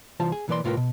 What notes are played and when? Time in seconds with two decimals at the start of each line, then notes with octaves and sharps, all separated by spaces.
0.20 C2 E3 F4 C5 A5
0.32 G#4
0.48 B1 E3 A#3 B4 D5 C6
0.64 C2 A2 F4 G4 A#4 B4
0.77 B2